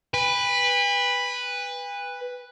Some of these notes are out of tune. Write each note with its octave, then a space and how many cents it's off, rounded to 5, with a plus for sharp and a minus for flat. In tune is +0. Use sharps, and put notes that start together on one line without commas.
B4 +0 G#5 -45